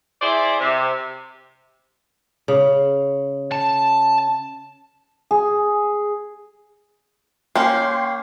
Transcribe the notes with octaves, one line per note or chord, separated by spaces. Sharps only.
E4 G#4 C5 D5
C3
C#3
A5
G#4
A#3 C#4 G5 C6